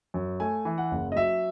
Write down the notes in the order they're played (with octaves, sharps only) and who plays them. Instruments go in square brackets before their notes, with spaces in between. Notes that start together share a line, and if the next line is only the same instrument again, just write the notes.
[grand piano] F#2
A3 G#5
E3
F#5
F#1
D#5
F#3 E5